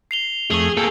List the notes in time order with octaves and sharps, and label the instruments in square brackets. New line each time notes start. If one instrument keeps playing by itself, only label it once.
[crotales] C7 F7 G7
[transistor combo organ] F2 A3 [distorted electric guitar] G#4 [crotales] C#6 F#7
[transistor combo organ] A#3 G5 [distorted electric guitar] G#4 A4